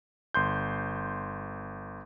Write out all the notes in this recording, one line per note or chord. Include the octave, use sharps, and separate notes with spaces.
G1 C6 G6